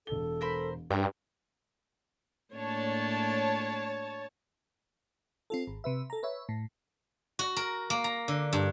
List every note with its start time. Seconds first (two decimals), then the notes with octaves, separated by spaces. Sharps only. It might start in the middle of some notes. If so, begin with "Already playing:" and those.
0.07 E1 A4 G7
0.41 A#4 C5 B5
0.90 G2 A#4 G5
2.54 A2 A#3 D4 C#5 A5
5.50 C4 F4 A4
5.67 G#1
5.84 C3 B4 E5
6.10 A4 A#5
6.23 B4 C#5 E5
6.49 A2
7.39 F#4
7.57 A#4
7.90 A#3
8.04 A#5
8.28 D3
8.53 G2